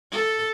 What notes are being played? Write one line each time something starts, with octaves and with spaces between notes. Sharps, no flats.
A4